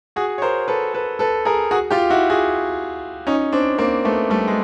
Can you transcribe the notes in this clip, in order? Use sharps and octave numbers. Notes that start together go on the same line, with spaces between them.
F#4 G#4
C#5
A#4 C5
A4 B4
A4 B4
A4 B4
G#4 A#4
F#4 G#4
F4 G4
E4 F#4
F#4 G#4
C#4 D#4
C4 D4
A#3 C4
A3 B3
G3 A3
G#3